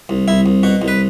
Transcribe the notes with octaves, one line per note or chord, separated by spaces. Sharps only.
C2
C2 E4
C2
B2 F#4
C2
B4